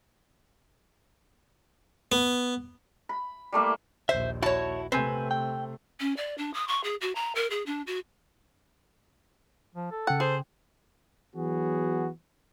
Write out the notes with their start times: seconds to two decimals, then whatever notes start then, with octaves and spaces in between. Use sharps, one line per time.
2.12 B3
3.09 B5
3.52 G3 A3 A#3 E4
4.09 A#1 D#2 C5 E5
4.43 E4 F#4 C#5 A5
4.92 C3 A3 C4 B4 G#5
5.31 G5
6.00 C#4
6.17 D5
6.38 D4
6.54 D#6
6.68 C#6
6.84 G#4
7.01 F#4
7.15 A#5
7.35 A#4
7.50 G#4
7.66 D4
7.87 F#4
9.75 F3
9.91 A4
10.07 C#3 F#5 G5
10.20 G#4 C5
11.35 E3 F#3 B3 F#4 G#4